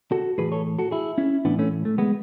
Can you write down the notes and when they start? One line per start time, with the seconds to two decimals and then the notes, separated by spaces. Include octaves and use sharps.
0.12 F#4 A4
0.38 A2 E3 G#4 B4
0.52 A4 C#5
0.79 F#4 A4
0.91 E4 G#4
1.18 C#4 E4
1.45 A2 E3 B3 D4
1.59 A3 C#4
1.85 A3
1.98 G#3 B3